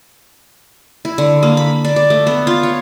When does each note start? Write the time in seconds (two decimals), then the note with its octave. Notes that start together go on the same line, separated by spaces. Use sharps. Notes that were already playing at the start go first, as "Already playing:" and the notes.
1.05 E4
1.18 D3
1.43 A#3
1.57 B5
1.85 D4
1.96 D5
2.10 A3
2.27 B3
2.47 F4
2.63 C#5